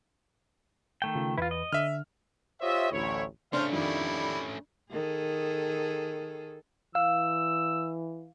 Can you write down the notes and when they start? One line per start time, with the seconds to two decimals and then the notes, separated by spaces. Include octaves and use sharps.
1.02 D#3 A3 G5
1.15 C#3 F4
1.38 E2 E3 E4 F4 B4
1.51 D#5
1.73 D3 E5 F6
2.61 F4 G4 C5 C#5 D#5 E5
2.91 A1 D2 E4 C#5
3.53 C#3 A3 C#4 D4 C5 C#5 F5 A5
3.72 F2 D#3 G3 E4
4.92 D#3 G#4 A4
6.95 E3 F5 E6